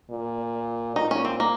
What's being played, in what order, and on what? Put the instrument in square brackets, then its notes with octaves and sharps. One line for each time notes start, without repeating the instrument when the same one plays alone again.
[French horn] A#2
[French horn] A#2 [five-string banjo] D#4
[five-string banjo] C#4
C4
A#3